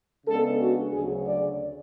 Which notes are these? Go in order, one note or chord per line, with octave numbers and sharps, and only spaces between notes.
C#3 G#3 B3 D4 A4
F#4
D2 C#3 F#3 G#4
D5